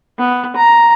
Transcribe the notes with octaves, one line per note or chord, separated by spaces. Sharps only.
B3
A#5